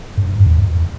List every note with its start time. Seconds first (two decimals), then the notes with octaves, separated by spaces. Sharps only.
0.17 G2
0.40 G2
0.46 E2